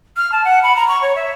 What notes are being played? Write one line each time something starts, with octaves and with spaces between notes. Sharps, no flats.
F6
A5
F#5
B5
A#5
C#6
C#5
E5